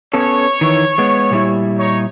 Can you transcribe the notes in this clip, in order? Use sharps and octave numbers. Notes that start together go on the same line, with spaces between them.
B3 C#4 A4 C#5
D#3 E3
G#3 B3
A#2 G3 E4
D#4 C#5